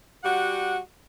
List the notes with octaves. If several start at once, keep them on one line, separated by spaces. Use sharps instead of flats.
G3 F#4 F#5